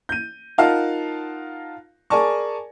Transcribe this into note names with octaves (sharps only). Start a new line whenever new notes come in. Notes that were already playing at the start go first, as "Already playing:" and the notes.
G6 D#7
D#4 F4 A#4 F5 F#5 A5
G#4 A#4 D5 G#5 A5 C#6